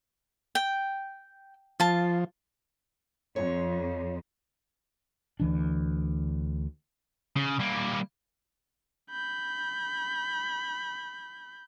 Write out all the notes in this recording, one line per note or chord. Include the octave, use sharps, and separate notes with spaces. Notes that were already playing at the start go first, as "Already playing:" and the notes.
G5
F3 F4 A5
F2 C#5
D2 E3 D4
C#3
G3 A#3
B5 G6